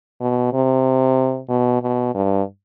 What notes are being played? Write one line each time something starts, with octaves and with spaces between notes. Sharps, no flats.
B2
C3
B2
B2
G2